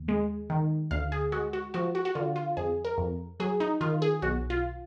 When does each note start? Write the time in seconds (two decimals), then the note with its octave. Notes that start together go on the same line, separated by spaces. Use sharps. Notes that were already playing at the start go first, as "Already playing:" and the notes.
Already playing: D#2
0.08 G#3
0.50 D#3
0.91 D2 F5
1.12 G#4
1.32 G#3 F#4
1.53 F#4
1.74 F3 F#4
1.95 F#4
2.05 F#4
2.15 D3 F4
2.36 F4
2.57 F2 G#4
2.85 A#4
2.98 F2
3.40 F#3 G#4
3.60 D#4
3.81 D#3 F4
4.02 G#4
4.22 B1 F#4
4.50 F4